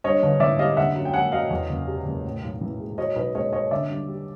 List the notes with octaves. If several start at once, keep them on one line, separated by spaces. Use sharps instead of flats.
G2 C#5 D#5
G1
E3 D5 E5
G3 D#5 F5
D3 E5 F#5
F#2
G5
F#3 F#5 G#5
F#2 D#5 F5
E2
F#1
C3
F#1
A2
B1
E3
G#3
B2 C#5 D#5
B1 B4 C#5
G#3 C#5 D#5
C#4 C#5 D#5
D3 D5 E5
G2
G3